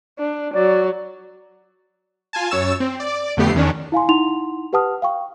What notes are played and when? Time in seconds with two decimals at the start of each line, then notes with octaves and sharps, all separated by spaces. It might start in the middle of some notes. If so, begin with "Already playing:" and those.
0.19 D4
0.54 F#3 D5
2.33 F4 G#5 A5
2.50 F#2 C#5 E6 A6 E7
2.80 C4
3.00 D5
3.37 F2 D3 A3 B3 G4 C7
3.54 E2 D#3 C#4 D4
3.92 E4 F5 G#5 C6
4.08 D#4 E4 F#5 C6 F7
4.73 G4 B4 F#5 A5 D#6 F6
5.02 F5 G5 C#6